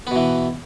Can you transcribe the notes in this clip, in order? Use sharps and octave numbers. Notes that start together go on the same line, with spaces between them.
B2 E3 B3